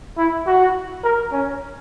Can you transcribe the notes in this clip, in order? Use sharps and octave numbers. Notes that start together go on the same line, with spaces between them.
E4
F#4
A#4
C#4